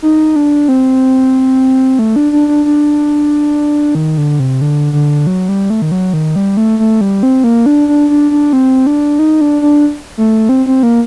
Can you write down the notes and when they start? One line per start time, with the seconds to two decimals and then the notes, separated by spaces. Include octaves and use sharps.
0.02 D#4
0.36 D4
0.69 C4
1.99 A3
2.16 D4
2.32 D4
2.48 D4
2.65 D4
3.95 D#3
4.18 D3
4.40 C3
4.61 D3
4.93 D3
5.27 F#3
5.49 G3
5.70 A3
5.82 D#3
5.92 F#3
6.13 D#3
6.36 G3
6.57 A3
6.79 A3
7.01 G3
7.23 C4
7.44 A#3
7.66 D4
7.88 D4
8.10 D4
8.31 D4
8.53 C4
8.86 D4
9.19 D#4
9.41 D4
9.62 D4
10.18 A3
10.49 C4
10.66 C4
10.83 A#3